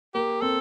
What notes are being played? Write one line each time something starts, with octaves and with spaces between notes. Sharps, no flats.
A#3 G4
C4 A4